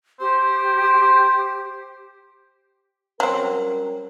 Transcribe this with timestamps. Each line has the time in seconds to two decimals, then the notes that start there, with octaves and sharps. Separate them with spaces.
0.20 G4 C5
3.20 F#3 G3 C4 C#4 A#4